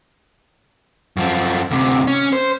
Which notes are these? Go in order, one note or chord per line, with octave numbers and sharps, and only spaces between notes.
F#2 F3
D2 C3
C#4
C5